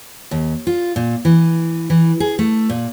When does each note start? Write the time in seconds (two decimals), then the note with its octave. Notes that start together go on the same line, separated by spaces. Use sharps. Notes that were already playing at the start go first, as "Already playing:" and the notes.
0.31 D#2
0.67 F4
0.96 A#2
1.25 E3
1.90 E3
2.20 G#4
2.39 A3
2.70 A#2